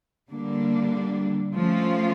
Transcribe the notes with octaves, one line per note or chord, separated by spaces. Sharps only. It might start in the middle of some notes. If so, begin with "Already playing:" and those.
D3 G3 A#3 D4
F3 A3 C#4 F4